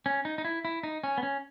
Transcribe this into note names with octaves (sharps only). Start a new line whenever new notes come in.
C#4
D#4
D#4
E4
E4
D#4
C#4
B3
C#4